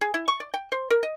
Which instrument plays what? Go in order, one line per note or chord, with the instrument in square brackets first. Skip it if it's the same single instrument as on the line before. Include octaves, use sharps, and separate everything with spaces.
[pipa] G#4
E4
C#6
D5
G5
C5
A#4
D#5